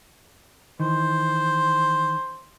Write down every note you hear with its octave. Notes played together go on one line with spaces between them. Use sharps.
D#3 E3 C5